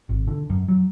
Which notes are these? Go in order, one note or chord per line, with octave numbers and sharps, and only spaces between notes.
G#1
D3
F#2
F#3